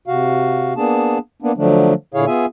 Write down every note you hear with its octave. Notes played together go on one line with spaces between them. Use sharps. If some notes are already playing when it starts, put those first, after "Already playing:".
C3 F#4 F5
A#3 B3 D4 G#4 A5
A#3 B3 D4
D3 F3 F#3 A3 D4
A#2 D3 E4 G#4 C#5 F5
B3 F4 G#4 E5 G#5